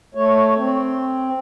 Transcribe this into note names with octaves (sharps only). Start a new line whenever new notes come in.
A3 C#5
C4